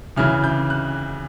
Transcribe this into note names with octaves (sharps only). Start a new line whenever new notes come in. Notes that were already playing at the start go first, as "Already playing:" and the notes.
D2 C#3 E3 F6
G6
F#6